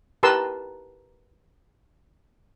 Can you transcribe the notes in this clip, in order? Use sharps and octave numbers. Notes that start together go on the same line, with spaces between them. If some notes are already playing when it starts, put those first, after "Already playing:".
G4 A#4 B4 A5 C6 E6